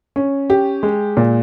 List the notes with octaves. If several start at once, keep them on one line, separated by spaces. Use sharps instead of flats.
C#4
G4
G#3
A#2